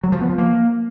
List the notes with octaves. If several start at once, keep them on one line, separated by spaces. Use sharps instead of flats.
F#3
F3
B3
F3
A#3